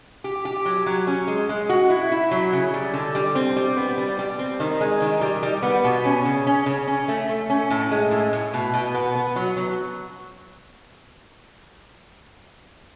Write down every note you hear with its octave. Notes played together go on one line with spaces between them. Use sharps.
G4
G4
F#3
F#3
C#4
G#3
G#3
F#4
E4
E4
F#3
C#3
G3
D3
G3
C4
G3
B3
G3
G3
C4
D#3
G#3
D#3
G3
G3
B3
B2
C#4
C#3
C#4
C#3
C#4
A3
A3
C#4
A2
G#3
A2
A2
B2
B2
B3
B3
F#3
F#3